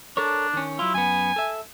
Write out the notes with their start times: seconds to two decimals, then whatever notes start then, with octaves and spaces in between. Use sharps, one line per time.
0.17 D4 A4 A#4 C#5
0.53 D#3 C#4
0.79 F#3 E4 F4
0.94 F#2 B3 G#5
1.36 A4 E5